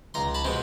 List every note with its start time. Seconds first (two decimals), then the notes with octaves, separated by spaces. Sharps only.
0.14 C#2 A#5 C6
0.35 A5 B5
0.44 B2 G#3 C4